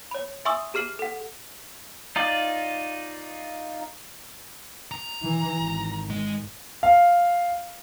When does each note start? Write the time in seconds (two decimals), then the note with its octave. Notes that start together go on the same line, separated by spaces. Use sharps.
0.11 C#5 B5
0.45 E5 G#5 C6 C#6 D#6 E6
0.74 G4 G#4 F6 C7 F#7
0.99 A4 F#5
2.16 D#4 F4 D5
4.91 A#5
5.22 E3
5.60 G#1
6.10 G#3
6.83 F5